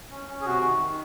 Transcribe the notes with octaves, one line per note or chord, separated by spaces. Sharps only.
C#4
C#4
G#4
C3 F#4
D#3
D#3